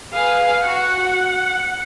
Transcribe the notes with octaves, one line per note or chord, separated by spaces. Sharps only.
G#4 B4 F5
F#4 F#5